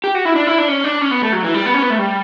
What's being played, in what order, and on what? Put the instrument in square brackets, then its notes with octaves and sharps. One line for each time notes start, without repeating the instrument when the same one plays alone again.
[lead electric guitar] G4
F#4
E4
D4
E4
D4
C#4
D4
C#4
B3
A3
F#3
E3
G3
B3
C#4
B3
A3
G3